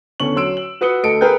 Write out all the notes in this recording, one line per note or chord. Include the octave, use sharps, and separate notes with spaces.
E2 D3 C#4 C#6 F#7
F#3 C#5 C6 E6 D7
F#7
F#4 B4 D#6 C#7 G7
D2 A4 D#5 C#7 D7
G#4 A#4 B4 G5 G6